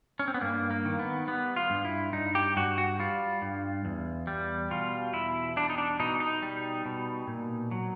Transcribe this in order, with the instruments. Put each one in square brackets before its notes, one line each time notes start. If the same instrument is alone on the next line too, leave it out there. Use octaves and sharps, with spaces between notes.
[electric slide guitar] C#4
C4
B3
G2 A#3
A#3
D#3
B3
G3 B3
F4
G2
E4
G2 D#4
G4
G2 F#4
F#4
G3 F4
G2
E2
G3
B2 F4
E2 E4
G3 D4
D#4
D4
B2 D#4
D#4
G3
B2
A#2
F#3